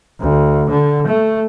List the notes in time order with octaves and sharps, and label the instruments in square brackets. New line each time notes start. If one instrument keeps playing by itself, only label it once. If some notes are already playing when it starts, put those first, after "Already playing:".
[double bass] D2
D3
A3